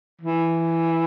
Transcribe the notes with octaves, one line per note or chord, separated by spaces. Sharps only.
E3